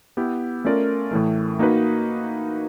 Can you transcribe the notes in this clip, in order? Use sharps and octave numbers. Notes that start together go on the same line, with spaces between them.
B3 E4 G4
A3 C#4 F4 A#4 D5
A2 E3 A3
A#3 D#4 F#4 B4